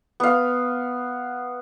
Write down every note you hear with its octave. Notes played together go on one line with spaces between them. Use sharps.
B3 F5